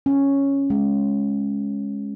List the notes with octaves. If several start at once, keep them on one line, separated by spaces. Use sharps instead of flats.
C#4
G#3